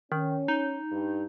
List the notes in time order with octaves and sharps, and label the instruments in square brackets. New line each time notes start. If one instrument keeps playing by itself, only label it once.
[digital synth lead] D#3 [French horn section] C#4
[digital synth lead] D#4
[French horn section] G2